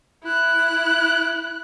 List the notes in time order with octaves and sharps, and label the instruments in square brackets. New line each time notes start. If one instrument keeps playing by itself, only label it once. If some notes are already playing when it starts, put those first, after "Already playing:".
[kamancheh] E4 F#6